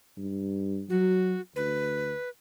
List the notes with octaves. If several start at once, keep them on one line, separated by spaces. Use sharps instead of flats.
G2
F#3 F#4
D2 B4